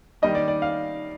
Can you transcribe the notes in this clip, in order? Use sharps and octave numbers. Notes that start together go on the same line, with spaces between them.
D#3 G3 A#3 D4 D#5
D5
D5
F5